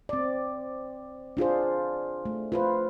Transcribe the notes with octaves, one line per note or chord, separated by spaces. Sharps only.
C4 D5
D4 F4 G#4 C5
A3
F4 B4 C5